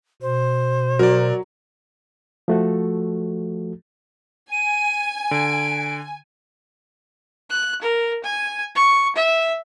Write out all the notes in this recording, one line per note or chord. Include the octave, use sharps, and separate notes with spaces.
B2 C5
F#3 A#4 D5
F3 A3 F#4 A4
G#5 D#7
D3 D7
F#6
A#4
G#5
C#6
E5